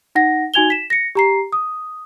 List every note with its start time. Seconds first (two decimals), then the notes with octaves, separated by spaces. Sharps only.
0.15 D#4 F#5 A#6
0.54 D#4 F#4 G#5 G#6 F7 G7
0.70 B6 E7
0.90 A#6 C#7
1.15 G4 A#5 C7
1.52 D#6